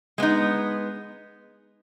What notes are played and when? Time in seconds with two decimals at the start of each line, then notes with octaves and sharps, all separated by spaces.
0.18 G#3 B3 D#4